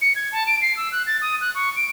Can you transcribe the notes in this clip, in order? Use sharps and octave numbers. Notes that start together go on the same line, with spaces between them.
C#7
G#6
A5
D7
C7
E6
F#6
A6
D#6
F#6
C#6
D7